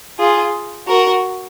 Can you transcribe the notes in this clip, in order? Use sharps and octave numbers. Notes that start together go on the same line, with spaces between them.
F4 G#4
F#4 A#4